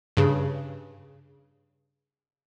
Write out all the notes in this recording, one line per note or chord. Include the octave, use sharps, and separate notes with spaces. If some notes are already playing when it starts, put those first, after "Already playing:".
G2 C#3